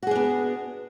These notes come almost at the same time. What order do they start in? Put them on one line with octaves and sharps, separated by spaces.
F#4 G#4 D4 B3